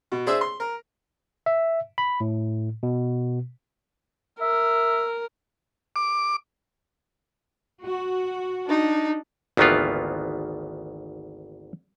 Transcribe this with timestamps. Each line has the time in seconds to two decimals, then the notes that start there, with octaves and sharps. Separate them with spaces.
0.12 B2
0.26 D4 G#4 C5 E5 E6
0.41 C6
0.60 A#4
1.46 E5
1.98 B5
2.20 A2
2.83 B2
4.41 A#4 E5
5.96 D6
7.86 F#4
8.67 D4 D#4
9.57 G#1 D2 D#3 E3 B3 F4